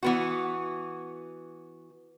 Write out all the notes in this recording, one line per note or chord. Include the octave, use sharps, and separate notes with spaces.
E3 B3 F#4